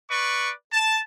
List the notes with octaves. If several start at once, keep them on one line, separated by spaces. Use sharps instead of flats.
B4 D5 C#6
A5